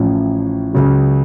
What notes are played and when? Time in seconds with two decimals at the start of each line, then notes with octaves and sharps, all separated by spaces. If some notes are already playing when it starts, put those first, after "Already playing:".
Already playing: A1 A2 F3
0.73 C#2 C#3 F#3